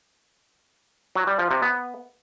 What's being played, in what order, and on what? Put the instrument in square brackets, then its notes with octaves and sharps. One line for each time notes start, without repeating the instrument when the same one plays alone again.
[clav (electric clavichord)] F#3
G3
F3
C3
B3